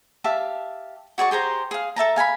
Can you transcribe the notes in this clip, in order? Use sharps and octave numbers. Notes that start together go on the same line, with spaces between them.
G4 E5 F5 A5
F#4 G#4 D5 C#6
G4 G#4 C5 A#5
G#4 F5
A4 E5 A5 A#5
F5 G#5 A#5 B5